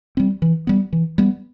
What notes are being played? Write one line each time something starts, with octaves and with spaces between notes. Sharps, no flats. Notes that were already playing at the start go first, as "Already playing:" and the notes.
G3 C4
E3
G3 B3
E3
G3 B3